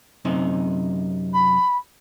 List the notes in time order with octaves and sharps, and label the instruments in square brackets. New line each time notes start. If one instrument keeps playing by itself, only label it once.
[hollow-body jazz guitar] F#2 C3 D#4
[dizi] B5